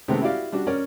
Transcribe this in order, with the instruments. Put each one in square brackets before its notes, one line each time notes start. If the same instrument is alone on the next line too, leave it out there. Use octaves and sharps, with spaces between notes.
[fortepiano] C3 D#3 G#3 A3 B3 C4
E4 F#4 G4 D5 F5
G3 D4 F#4
C#4 A#4 D5